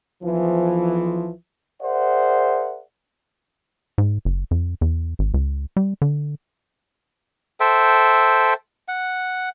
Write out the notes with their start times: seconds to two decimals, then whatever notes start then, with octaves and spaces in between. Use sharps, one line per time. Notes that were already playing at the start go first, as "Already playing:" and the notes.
0.23 B1 E3 F3
1.82 G#4 A#4 C5 D5 E5 F#5
3.98 G#2
4.25 F#1
4.51 F2
4.81 E2
5.19 G#1
5.34 C#2
5.77 G3
6.02 D3
7.60 A4 C5 E5 G5
8.88 F#5